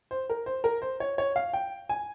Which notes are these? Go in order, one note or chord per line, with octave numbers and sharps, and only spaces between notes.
C5
A#4
C5
A#4
C5
C#5
C#5
F5
G5
G#5